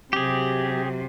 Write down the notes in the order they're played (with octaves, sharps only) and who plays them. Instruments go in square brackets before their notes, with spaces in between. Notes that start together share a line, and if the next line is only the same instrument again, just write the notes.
[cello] C3 F#3 [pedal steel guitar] G4 G#4